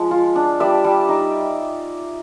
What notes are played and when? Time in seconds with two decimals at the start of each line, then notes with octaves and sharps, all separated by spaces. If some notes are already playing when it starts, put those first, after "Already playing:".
Already playing: F3 G#3
0.11 F4
0.36 D4
0.60 G3 D5 E5
0.84 G3
1.09 D#4